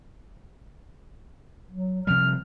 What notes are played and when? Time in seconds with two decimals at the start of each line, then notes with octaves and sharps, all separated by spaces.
1.71 F#3
2.07 C3 F3 G3 F6